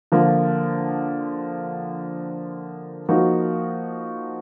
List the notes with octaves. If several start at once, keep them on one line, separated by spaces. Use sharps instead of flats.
D3 F3 A#3
F3 A#3 D#4 F#4